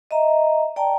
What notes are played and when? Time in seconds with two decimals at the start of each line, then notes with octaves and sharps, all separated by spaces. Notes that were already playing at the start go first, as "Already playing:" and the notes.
0.11 D#5 E5 A#5
0.76 D5 G5 A5 A#5